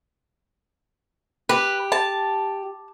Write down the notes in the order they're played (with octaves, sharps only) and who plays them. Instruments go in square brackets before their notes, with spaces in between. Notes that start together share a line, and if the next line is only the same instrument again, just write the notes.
[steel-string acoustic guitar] G4 [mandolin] B4
[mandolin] A5